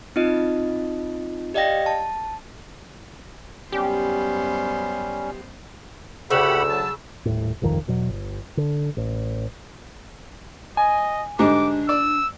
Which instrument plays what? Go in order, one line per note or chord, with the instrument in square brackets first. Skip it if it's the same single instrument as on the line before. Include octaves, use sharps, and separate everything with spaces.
[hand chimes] C4 D#4 F4 D#5
G4 D5 D#5 F5 G5 A#6
A5
[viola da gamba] F#2 B3 C5 [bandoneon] G3 C#4 [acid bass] G4
[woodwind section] D2 [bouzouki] C#3 [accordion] G4 F#5 B5 [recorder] E6
[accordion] F#3 A5
[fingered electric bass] D#1 A2
G1 C2 F2 D#3
E2 B2 F#3
G1
D3
A1
[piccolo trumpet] D#5 [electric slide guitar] G#5
[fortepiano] G#2 D3 G3 [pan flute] D4 [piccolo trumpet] D6
[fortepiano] D5 [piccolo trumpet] E6